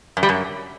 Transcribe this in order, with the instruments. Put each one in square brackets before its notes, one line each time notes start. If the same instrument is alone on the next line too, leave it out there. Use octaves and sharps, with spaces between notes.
[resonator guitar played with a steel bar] F#2
G3
F#2